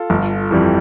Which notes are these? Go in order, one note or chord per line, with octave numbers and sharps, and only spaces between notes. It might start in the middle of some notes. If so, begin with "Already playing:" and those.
Already playing: F4 A4
G1
F2 E3 G3